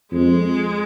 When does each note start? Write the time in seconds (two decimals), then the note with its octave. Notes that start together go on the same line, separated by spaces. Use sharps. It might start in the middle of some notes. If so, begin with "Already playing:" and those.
0.12 F2 G#3